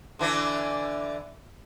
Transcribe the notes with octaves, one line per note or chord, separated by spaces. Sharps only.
D3 E3 D4